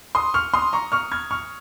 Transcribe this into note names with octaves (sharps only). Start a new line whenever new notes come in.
C6 D#6
C#6 F6
C6 D#6
A#5 C#6
C#6 F6
F6 G#6
C#6 F6